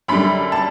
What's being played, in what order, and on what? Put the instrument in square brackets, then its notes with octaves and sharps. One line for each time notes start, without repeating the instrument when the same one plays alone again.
[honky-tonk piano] F#2 D3 G3 B5
A5